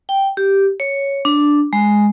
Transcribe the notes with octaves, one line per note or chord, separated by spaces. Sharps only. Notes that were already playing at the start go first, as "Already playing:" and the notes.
G5
G4
C#5
D4
G#3